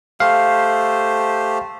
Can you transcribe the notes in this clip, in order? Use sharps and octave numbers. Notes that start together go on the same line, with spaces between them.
A3 G4 C5 F5